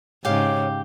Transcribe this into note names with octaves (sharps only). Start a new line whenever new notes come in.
G#2 C#3 G4 C#5 F5